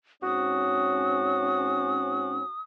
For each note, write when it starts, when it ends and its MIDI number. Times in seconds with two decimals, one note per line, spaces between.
0.23 2.40 44
0.23 2.40 60
0.23 2.40 61
0.23 2.50 66
0.23 2.60 87